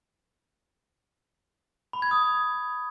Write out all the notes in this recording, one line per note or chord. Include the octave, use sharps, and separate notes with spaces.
B5
G#6
D#6